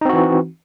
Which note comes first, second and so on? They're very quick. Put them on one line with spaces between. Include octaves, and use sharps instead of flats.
D#4 C4 F#4 E3